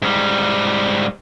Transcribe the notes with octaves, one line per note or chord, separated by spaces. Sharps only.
G#2 G3